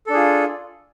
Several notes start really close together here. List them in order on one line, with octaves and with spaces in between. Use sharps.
A4 D4 G#4 F4